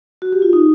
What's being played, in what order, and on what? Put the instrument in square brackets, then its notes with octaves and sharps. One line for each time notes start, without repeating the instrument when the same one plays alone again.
[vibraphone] F#4
G4
F4
D#4